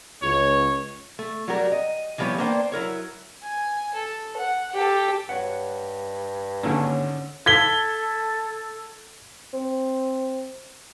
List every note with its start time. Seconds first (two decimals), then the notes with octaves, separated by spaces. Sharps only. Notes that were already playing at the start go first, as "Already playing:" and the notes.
0.23 C#2 C#5
1.19 A3
1.48 F#3 G3 F#4 G4 A#4
1.72 D#5
2.18 E3 F3 G3 B3 C#5
2.38 A#3 B3 D4 C5 C#5 G5
2.72 F#3 E4 A#4 C#5
3.42 G#5
3.94 A4
4.37 F#5
4.74 G4 A4
5.29 G2 C#5 F#5
6.63 G#1 D3 A#3 C#4 A5 A#5
7.46 A4 G#6 B6 G7
9.53 C4